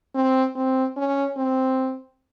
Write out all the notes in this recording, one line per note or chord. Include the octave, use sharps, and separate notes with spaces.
C4
C4
C#4
C4